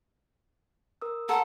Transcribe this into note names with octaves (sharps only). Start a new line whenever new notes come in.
A#4 D#6 E6
A4 F#5 A#5 C6